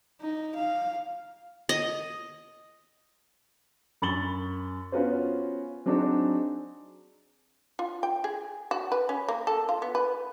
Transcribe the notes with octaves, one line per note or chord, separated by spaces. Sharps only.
D#4
F5
D#5
F#2 B5 C#6 A6 F#7 G7
B3 C#4 F4 F#4 B4 C5
F#3 C4 D4 D#4 F#4 G#4
F4
G5
G#4
F#4
B4
C#4
A#3
A4
F4
B3
B4